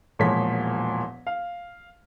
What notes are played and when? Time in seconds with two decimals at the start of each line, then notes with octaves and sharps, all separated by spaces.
0.19 E1 A#2 F3 G#3 C#5 B6
1.27 F5